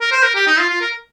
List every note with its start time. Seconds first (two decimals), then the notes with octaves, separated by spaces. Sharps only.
0.01 A#4
0.12 C5
0.23 A#4
0.35 G4
0.47 D#4
0.58 F4
0.69 F4
0.81 A#4